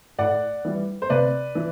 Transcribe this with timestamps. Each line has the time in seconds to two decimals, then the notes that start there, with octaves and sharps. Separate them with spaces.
0.19 A2 D5 F#5
0.65 E3 G3
1.02 C5
1.10 C3 B4 D5
1.55 E3